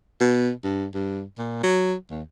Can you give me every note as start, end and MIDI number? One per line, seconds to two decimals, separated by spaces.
0.20 0.51 47
0.64 0.87 43
0.94 1.23 43
1.38 1.59 46
1.63 1.94 54
2.10 2.22 39